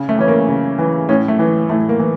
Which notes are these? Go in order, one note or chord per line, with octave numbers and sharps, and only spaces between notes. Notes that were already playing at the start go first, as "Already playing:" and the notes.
Already playing: C#3
A3
E3 C#4
A#3
C#3
E3
A2 C#4
A3
E3
A2 A3
A#3
E3